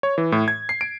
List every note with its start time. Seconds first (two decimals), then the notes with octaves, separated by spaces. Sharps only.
0.03 C#5
0.18 E3
0.32 A2
0.48 G#6
0.69 C7
0.81 D7